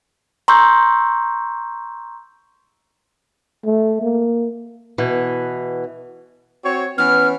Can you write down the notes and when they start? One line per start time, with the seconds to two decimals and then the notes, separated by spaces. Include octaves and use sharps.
0.48 A#5 C6 C#6 E6 G6
3.65 A3
4.02 A#3
4.98 B2 E3
6.64 C4 F#4 C#5
6.98 E3 B3 C#4 F6